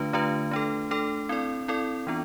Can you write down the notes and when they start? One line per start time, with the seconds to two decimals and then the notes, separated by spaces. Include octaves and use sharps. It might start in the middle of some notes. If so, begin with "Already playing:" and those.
Already playing: D3 A3 D4 F4 B4
0.13 D3 A3 D4 F4 B4
0.51 A3 D4 A4
0.91 A3 D4 A4
1.29 C4 E4 A4 D5
1.68 C4 E4 A4 D5
2.07 E3 B3 D4 F4